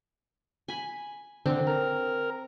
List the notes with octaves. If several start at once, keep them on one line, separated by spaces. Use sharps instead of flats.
G#5 B5
D3 C4
A#4